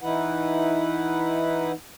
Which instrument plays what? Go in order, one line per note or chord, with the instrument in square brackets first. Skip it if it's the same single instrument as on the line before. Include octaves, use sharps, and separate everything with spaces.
[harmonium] E3 D#4 E4 B4 F#5